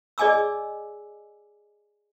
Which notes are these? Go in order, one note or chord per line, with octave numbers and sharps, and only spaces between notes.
G#4 D5 D#5 G#5 D6 E6